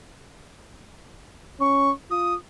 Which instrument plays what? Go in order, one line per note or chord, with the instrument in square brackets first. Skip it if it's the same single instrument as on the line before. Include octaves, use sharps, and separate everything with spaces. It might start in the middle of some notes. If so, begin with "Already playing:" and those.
[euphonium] C#4 [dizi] C#6
[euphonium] F4 [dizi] D#6